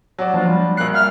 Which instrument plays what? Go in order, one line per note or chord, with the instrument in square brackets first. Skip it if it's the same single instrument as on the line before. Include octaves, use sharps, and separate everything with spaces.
[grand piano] F#3 F#4 D5
[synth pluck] F3 [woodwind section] A#3 D4 F4
[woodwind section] G3
[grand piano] A#1 A#3 C7 [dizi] F#6
[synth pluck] E5 [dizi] F6